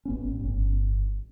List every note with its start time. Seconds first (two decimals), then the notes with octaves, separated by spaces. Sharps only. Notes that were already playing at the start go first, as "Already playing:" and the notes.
0.05 A1 B3 C#4
0.40 G1